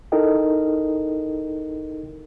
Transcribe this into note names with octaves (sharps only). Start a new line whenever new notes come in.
D#4 E4 A4 A#4 D#5 G5